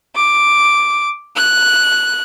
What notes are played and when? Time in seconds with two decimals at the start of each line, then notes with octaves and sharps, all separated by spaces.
0.16 D6
1.36 F#6